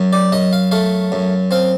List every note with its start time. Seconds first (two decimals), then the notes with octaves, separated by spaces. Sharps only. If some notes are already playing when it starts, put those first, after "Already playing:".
Already playing: F#2
0.13 D5
0.32 F#2 D#5
0.53 F5
0.71 A3 F5
1.12 F#2
1.51 C4 F5